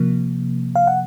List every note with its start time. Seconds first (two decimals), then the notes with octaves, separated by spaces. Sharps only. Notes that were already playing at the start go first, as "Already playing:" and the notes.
Already playing: C3 F3 A#3
0.76 F5
0.87 F#5